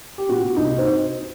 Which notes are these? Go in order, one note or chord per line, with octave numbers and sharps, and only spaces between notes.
G4
A#2 F#4
A#2
C2 D#4
C4